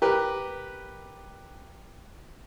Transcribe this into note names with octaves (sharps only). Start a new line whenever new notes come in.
G4 A#4 B4